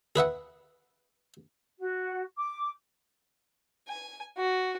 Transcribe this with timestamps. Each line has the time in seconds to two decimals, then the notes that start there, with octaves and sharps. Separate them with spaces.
0.16 G#4 B4 E5 F#5
1.79 F#4
2.36 D6
3.89 G#5
4.37 F#4